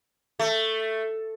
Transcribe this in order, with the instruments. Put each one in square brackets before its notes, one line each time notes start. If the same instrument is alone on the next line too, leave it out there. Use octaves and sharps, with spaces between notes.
[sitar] A3